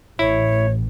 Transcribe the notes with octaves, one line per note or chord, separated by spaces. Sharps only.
A1 E4 C#5